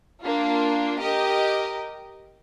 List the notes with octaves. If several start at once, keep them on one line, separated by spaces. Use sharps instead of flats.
A#3 D4 F4
G4 A#4 D#5